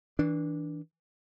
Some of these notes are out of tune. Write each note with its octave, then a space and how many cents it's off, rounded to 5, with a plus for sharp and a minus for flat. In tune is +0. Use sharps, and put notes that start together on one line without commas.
E3 -30 D4 +0